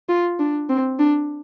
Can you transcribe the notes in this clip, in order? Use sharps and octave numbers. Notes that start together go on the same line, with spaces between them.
F4
D4
C4
D4